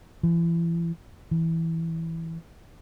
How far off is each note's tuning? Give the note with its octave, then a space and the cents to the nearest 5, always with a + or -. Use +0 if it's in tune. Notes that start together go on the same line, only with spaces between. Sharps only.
E3 +35
E3 -5